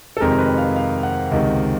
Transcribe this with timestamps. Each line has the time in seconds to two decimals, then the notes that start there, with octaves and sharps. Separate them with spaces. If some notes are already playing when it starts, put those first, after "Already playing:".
0.17 A4
0.20 F2 C3 D#3 G#3 A#4
0.39 B4
0.58 F5
0.76 F5
1.03 F#5
1.32 C#2 C3 D#3